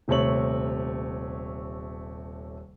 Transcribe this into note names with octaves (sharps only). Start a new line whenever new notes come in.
D#1 C3 A3 C#5 F#7